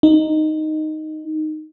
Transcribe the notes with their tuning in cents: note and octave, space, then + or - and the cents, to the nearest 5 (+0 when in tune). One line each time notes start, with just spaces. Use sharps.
D#4 -5